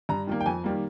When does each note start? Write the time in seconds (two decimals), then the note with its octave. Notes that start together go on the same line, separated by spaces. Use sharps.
0.09 G2 A#5
0.27 D#3 G3 A#3
0.41 G5
0.46 F2 G#5
0.64 D#3 G3 A#3